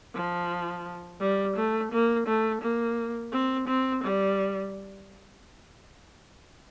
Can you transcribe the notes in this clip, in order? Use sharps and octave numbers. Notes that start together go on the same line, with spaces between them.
F3
G3
A3
A#3
A3
A#3
C4
C4
G3